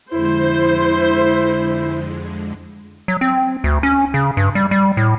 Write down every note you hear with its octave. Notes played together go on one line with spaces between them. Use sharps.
F2 D3 G#3 E4 C5
F#3
C4
D2
C#4
C#3
G2
G3
G3
A2